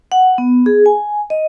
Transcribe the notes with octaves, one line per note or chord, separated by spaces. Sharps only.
F#5
B3
G#4
G#5
D#5